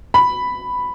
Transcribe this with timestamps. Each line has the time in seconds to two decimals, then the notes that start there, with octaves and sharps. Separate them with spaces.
0.14 B5